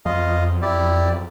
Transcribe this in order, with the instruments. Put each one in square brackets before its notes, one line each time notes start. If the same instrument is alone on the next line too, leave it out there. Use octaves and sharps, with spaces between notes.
[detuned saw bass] F2 [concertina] F4 D#5 F5
[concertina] E4 G4 D5